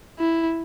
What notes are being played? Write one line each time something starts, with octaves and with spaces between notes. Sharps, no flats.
E4